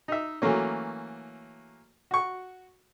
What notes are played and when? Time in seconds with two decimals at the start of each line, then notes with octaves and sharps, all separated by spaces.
0.08 D#4 E5
0.42 E3 F#3 A3 A#3 C#4
2.11 F#4 C#6